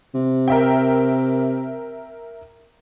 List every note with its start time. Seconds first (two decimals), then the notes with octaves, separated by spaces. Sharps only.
0.14 C3
0.48 A#4 E5 G5